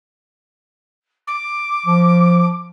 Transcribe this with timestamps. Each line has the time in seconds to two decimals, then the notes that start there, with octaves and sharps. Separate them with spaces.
1.27 D6
1.86 F3